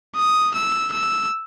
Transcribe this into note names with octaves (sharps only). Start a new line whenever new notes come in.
D#6
E6
E6